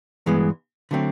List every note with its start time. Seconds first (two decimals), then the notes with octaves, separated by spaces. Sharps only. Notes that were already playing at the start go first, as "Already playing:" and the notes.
0.26 G2 E3 G#3 B3
0.91 D3 F#3 A3 C4